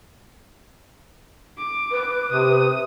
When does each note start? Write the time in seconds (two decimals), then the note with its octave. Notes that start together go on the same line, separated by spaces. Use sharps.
1.57 D6
1.92 B4
2.32 C3 D#6